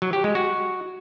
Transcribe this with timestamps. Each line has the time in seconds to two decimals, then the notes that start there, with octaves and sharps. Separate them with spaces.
0.02 F#3
0.13 G4
0.24 G#3
0.35 F#4